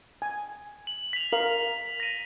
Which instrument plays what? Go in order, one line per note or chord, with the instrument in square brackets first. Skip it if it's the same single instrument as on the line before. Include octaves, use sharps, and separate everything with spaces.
[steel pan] G#5
[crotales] F#7
B6 F7
[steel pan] A#4 F5 [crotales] F#7
[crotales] A#6 D#7